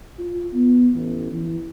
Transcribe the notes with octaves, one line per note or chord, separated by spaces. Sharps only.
F4
B3
A1
E3